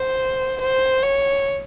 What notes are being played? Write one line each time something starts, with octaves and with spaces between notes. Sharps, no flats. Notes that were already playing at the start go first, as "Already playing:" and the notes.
Already playing: C5
C5
C#5